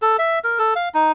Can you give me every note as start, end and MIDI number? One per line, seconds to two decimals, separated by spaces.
0.02 0.17 69
0.19 0.39 76
0.44 0.59 70
0.59 0.74 69
0.76 0.89 77
0.94 1.12 63